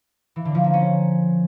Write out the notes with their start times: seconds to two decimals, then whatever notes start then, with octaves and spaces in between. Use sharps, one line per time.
0.36 E3
0.45 D3
0.55 F3
0.64 A#3
0.73 C#4